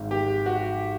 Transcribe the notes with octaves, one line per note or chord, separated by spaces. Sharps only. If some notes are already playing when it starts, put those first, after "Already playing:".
Already playing: G#1 G#2 D#3
G4
F#4